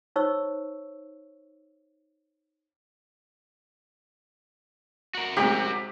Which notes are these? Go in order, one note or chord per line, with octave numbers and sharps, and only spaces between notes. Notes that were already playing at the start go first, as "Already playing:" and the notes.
D#4 C5 C#5 C#6 E6
F#4 A#4
D2 G#2 C3 G4